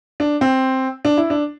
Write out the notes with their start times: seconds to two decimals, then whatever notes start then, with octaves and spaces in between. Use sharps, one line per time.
0.20 D4
0.41 C4
1.05 D4
1.17 E4
1.30 D4